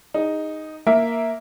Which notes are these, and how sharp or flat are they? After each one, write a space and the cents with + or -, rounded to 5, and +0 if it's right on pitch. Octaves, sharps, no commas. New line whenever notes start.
D#4 +0 G#4 -25
A#3 +0 A#4 +0 E5 +0